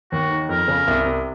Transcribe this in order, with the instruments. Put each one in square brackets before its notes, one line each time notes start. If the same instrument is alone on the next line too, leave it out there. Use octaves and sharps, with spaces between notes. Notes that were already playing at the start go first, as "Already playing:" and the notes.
[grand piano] D#2 [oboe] F#4
[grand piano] D#3
[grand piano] F2 [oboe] A#4
[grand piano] C#3
C2
C3